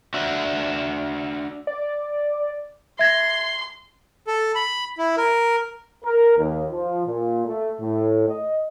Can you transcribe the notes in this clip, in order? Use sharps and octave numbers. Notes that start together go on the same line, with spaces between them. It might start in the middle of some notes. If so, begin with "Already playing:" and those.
D4 F#4 E5
D5
E5 C6 G#6 A#6
A4
B5
E4
A#4
A#4
D#2
F3
A#2
A3
A2
D#5